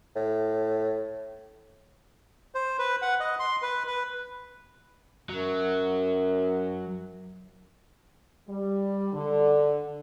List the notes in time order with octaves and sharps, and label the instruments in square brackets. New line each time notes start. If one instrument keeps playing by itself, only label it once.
[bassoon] A2
[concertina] C5
B4
F#5
D#5
C6
B4
B4
[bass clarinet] F#2 [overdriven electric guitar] F#3
[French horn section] G3
D3